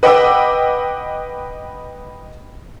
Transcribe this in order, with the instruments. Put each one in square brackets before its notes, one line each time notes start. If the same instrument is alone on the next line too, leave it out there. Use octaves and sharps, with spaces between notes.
[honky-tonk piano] B4 D#5 F#5 G5 D6 E6